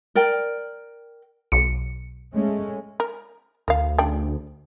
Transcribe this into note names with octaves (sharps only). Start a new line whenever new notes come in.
A#4 D5 G5
B1 C#7
G#3 A3 C#4
A#4
D2 A#4 F5
C#3 D4 G5